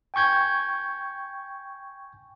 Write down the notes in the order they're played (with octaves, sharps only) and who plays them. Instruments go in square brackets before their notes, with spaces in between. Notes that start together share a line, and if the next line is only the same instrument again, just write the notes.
[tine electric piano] G5 G#5 C#6 G6 G#6